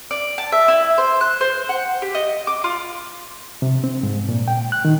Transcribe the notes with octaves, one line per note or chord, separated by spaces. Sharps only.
D5
A5
E5
E4
C5
F#6
C5
F#5
G4
D#5
D6
F4
C3
C4
G#2
A#2
G5
F#6
D#3